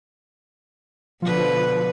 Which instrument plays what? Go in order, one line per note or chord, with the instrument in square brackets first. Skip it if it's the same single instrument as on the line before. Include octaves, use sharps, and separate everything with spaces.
[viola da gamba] B2 D3 B4 [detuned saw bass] F3